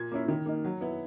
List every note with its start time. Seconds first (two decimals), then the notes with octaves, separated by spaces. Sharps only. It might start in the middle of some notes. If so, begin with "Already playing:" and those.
Already playing: A#2 G#6
0.12 A#3 C#4 E4
0.28 D#3
0.46 A#3 D#4
0.65 F#3
0.81 B3 E4